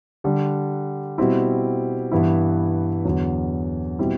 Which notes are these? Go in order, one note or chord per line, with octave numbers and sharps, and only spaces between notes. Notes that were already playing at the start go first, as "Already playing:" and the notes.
D3 G3 D4
B2 G3 C4 E4
G2 E3 B3 E4
E2 D3 F#3
B2 G3 C4 E4